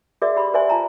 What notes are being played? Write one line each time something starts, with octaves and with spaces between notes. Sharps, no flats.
F#4 G#4 A#4 D5 E5
G4 B5 C6
A#4 C5 D5 E5 G#5 C6
F4 A5 A#5